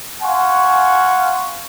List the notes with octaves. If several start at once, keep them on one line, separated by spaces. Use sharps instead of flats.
F5 F#5 G#5 C6 C#6